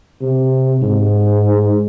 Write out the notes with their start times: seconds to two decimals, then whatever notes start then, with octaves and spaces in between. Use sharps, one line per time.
0.22 C3
0.81 G#2